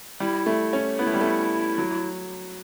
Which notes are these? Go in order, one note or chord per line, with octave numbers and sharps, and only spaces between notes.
G3 E4
A3
C#4
B3 E4
A3
G3
A3
F#3